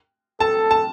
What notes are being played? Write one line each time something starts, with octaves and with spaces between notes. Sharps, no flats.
A4 A5
A5